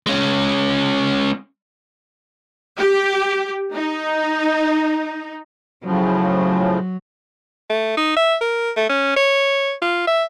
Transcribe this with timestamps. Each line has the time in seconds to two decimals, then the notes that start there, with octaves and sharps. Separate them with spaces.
0.07 G#3 C#4
2.79 G4
3.73 D#4
5.84 A2 C#3 F3 F#3
7.70 A3
7.97 D#4
8.16 E5
8.41 A#4
8.76 A3
8.89 C#4
9.16 C#5
9.82 F4
10.07 E5